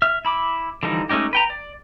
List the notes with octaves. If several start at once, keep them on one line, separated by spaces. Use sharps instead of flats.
E5 F6
E4 B5 D6
D3 E3 F3 G3 D#4
G#3 A3 C#4 D#4 G4
B4 G5 A#5
D5